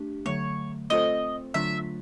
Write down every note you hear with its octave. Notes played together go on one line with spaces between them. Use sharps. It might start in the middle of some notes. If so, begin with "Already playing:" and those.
Already playing: A3 D4 G4
D3 F#3 A3 C#5
A3 C4 F4 A4 C5 D#5
D3 F#3 A3 D4 F4 E5